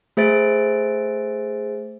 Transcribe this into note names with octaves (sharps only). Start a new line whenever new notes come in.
A3 G#4 C5 E5 A6 D7